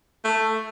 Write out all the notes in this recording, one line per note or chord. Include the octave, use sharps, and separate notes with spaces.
A3